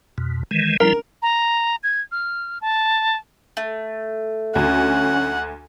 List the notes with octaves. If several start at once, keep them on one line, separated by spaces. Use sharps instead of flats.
F2 B2
D#3 E3 G#3
F3 G3 E4 A#4
A#5
G#6
F6
A5
A3
D2 C#4 F#5